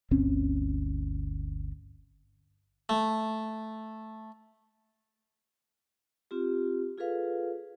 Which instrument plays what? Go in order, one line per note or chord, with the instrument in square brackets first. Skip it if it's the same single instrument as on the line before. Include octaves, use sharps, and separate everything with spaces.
[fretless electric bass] G1 D2 C4 C#4
[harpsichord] A3
[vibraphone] C4 F4 G4
F4 G#4 A4 B4 F5